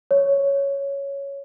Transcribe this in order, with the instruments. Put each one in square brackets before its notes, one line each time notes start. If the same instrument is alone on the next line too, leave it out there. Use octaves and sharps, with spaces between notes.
[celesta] C#5